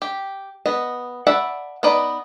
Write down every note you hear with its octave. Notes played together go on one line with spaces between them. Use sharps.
G4
B3 D#5
D5 E5 F#5 A5 B5
B3 D#4 B4 D5 D#5